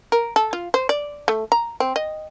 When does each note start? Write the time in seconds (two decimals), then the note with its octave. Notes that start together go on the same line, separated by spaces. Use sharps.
0.12 A#4
0.36 A4
0.53 F4
0.74 C5
0.89 D5
1.28 A3
1.52 A#5
1.80 C4
1.96 D#5